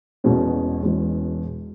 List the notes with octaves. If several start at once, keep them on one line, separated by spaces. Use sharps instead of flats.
E1 E2 B2 G#3 C#4
E1 E2 B2 G#3 C#4